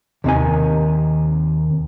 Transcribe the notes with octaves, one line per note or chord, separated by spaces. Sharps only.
D#2 C3 D#3 G#5